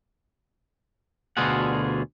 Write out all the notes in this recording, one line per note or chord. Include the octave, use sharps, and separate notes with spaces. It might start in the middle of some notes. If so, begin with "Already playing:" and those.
D2 B2 D3 F4 G#4 F#5